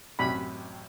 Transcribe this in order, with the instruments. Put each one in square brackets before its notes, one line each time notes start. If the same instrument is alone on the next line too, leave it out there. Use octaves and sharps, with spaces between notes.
[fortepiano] A1 F#2 C3 [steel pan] B5